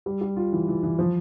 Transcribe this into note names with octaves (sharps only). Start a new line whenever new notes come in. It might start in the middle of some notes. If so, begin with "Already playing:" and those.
G3
G3
F4
E3
E3
E3
F3